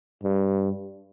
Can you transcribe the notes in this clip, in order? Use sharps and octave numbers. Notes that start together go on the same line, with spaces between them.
G2